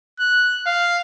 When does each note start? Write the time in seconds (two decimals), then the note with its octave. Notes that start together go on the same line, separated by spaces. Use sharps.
0.19 F#6
0.66 F5